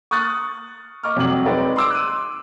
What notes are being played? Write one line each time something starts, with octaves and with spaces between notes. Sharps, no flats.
C#6 D#6 F6 F#6 A6
D#5 C#6 D6 F6
F2 C3 F#3 G3 F#7
G#3 C4 D#4 B4 C#5 D5
C6 D6 E6 D7
F#6 D#7